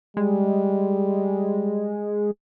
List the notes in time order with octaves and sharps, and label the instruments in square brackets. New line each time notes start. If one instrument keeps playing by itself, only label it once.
[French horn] G3 [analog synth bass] G#3